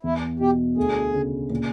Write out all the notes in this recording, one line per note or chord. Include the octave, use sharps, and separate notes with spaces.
E2 E4
B2 G4
D2 G#4
C#3
A#2